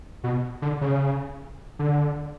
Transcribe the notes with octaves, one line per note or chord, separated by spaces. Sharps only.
B2
D3
C#3
D3